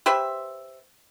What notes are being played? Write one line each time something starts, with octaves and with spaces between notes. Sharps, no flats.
G4 B4 C5 E5